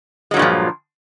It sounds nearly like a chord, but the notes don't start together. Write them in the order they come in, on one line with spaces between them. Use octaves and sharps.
G#3 F#3 G2 A#2 F3